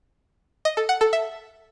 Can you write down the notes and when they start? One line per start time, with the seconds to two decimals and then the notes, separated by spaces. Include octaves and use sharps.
0.65 D#5
0.77 A4
0.89 F#5
1.01 A4
1.13 E5